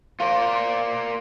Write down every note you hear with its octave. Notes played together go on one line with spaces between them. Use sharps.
F4 A#4 C5 D5 F5